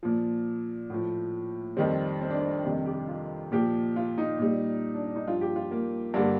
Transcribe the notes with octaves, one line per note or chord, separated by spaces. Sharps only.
A#2 F3
A2 F3
F2 D#3 G3 C4
C4
D4
C4
F2 C3 D#3 G3
G4
F4
A#2 F3 G4
F4
D#4
A#2 G3
D4
D4
D#4
G2 F3 F4
G4
F4
A#3
G2 D3 G3 A#3